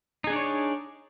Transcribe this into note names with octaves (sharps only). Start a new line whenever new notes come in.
D4 D#4 G#4 C#5 D5